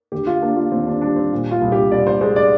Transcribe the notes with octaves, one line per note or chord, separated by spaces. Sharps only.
D3 G4
F4
A#3 D4
F4
D#2 C4
D4
G3 D4
C4
A#2
F4
C2
G4
C2 D5
C5
G#3 C5
D5